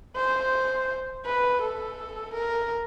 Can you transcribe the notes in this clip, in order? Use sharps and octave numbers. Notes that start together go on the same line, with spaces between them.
C5
B4
A4
A#4